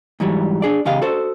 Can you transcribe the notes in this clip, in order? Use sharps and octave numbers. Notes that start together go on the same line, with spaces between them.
G#2 E3 F#3 G3
D4 G#4 D5
E2 C#3 G4 D#5 F5
F#4 A4 C5